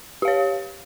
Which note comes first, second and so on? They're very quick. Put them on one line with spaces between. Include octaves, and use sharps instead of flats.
G4 F5 C#5